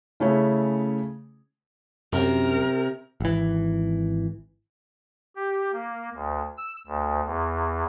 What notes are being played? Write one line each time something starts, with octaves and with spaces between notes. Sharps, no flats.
C#3 A3 C#4 E4 G#4 C#5
F#2 C3 A#4
G#1 E3
G4
A#3
D2
E6
D2
E2